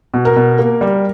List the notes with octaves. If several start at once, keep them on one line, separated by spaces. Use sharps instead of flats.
B2
A#4
B2
A#3
G3